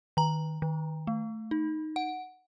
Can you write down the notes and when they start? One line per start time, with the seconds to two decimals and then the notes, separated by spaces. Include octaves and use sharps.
0.17 D#3 A#5
0.62 D#3
1.07 A3
1.51 D#4
1.96 F#5